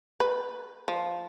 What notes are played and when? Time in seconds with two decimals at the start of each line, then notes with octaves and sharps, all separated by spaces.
0.20 B4
0.88 F3